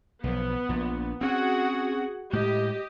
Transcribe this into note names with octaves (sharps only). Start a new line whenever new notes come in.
B1 F3 B3
A#1 A#2
C4 C#4 F#4 G#4 F#5
A2 G#3 G4 D#5